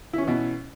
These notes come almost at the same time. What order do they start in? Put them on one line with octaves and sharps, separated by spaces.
E4 C#4 E3 B2